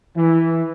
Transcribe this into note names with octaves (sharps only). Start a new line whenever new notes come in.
E3